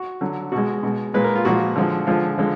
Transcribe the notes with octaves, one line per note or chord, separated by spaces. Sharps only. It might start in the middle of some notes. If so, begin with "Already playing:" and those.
Already playing: F#4
D3 F#3
B2 F#4
G#3
B2 G#3
A#2 G#3 B4
A#4
F4
A#2 F3 G#3 F#4
D3 F3 G#3
D3 F3 G#3 F4
D3 F3 G#3